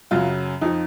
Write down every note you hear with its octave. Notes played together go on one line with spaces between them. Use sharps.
F#2 C#3 F#3 F4
F2 F3 D#4